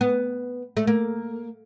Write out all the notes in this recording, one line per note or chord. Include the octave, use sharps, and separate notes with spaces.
B3
A3
A#3